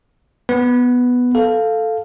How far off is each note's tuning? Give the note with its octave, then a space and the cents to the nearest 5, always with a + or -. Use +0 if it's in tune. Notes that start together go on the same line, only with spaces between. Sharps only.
B3 +0 B4 +0
A4 +0 F5 +0